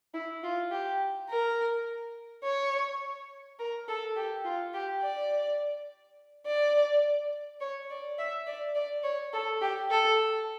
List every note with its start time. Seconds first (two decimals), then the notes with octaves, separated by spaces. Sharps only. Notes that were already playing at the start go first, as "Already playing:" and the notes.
0.14 E4
0.44 F4
0.71 G4
1.30 A#4
2.44 C#5
3.59 A#4
3.88 A4
4.16 G4
4.45 F4
4.74 G4
5.03 D5
6.46 D5
7.61 C#5
7.90 D5
8.19 E5
8.47 D5
8.75 D5
9.04 C#5
9.33 A4
9.61 G4
9.91 A4